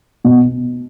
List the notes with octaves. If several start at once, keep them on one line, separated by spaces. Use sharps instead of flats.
B2